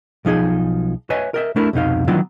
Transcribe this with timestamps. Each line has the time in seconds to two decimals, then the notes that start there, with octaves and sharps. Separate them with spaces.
0.25 B1 F3 D#4 G#4
1.10 B4 C#5 D#5 E5 G#5
1.34 A#4 D#5 E5
1.56 A3 D4 E4 A#4
1.73 C2 F2 B2 D#4 F5
2.08 D#3 E3 F#3 B3 D4 F4